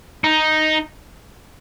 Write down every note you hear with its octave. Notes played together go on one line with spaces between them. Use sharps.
D#4